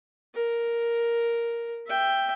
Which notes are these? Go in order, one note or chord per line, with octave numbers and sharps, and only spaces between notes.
A#4
E5 G5